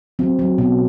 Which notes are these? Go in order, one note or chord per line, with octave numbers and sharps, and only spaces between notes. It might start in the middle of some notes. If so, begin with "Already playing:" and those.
F#3 C4
F#3
B2